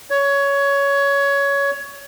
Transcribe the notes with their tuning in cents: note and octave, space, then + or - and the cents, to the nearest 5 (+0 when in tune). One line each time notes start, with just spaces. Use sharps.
C#5 +15